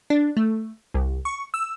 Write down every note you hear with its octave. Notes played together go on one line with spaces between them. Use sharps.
D4
A3
C2
C#6
E6